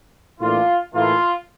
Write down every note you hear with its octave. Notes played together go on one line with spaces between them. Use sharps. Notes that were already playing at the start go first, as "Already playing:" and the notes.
A2 E3 A#3 D4 F4
A2 E3 A#3 F4